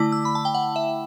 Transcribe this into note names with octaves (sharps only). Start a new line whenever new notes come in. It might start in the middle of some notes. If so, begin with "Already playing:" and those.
Already playing: D3 A3 E4 D6
E6
B5
A5
G5
F#5
E5